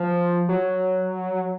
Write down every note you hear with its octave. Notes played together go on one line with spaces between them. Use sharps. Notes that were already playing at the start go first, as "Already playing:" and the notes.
Already playing: F3
F#3